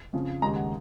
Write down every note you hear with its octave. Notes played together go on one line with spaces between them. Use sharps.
F2 C#3 F3
D#2 C#3 G#3 A#5
F#5